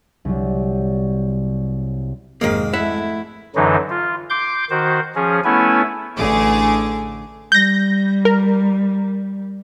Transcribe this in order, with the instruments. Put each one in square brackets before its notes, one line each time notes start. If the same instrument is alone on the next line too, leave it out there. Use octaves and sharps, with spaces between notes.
[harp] C2 F#3
[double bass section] G#1 F2 C3 [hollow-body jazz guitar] D#3 A#3 [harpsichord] G#3
[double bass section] A3 [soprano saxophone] E4 [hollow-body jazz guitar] E5 F#5
[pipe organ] F#2 D3 E3 F#3 D#4
F4
C6 D6 G6
D#3 F#4 C5
F3 C#4 G#4
A3 B3 C#4 E4 G#5
[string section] A1 D3 A3 G#4 D6
[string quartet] G3 [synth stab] G6 A#6
[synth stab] A#4